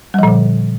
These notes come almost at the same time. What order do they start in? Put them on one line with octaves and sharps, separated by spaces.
G3 F3 A#2 D3